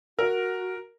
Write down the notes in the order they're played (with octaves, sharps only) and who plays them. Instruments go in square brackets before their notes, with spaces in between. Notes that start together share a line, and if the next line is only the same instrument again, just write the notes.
[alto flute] F#4 [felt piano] A#4